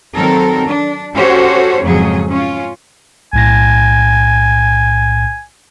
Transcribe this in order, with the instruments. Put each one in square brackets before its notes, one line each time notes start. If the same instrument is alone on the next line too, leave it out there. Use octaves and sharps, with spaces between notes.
[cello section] D#3 F#3 C4 A4 A#4
D4
C#4 F#4 G4 A4 C5 C#5
F2 G#2 C#3 F#3 G#4
C#4 F4
[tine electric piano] B1 A2 A#6 [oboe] G#5